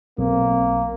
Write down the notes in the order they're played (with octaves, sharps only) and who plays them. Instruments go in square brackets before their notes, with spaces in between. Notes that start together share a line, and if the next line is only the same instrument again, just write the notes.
[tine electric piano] B1 [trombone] A#3 [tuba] C4